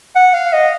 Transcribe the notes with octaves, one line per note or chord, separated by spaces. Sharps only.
F#5
F5
D#5